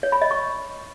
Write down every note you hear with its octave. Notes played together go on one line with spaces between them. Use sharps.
C#5
B5
D#5
C#6